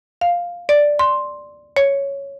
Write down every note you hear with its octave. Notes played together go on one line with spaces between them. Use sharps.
F5
D5
C6
C#5